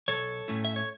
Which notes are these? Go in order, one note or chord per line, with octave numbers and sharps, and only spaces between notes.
B1 A4 C#5
A2 A3 C#4 E4
E5
C#5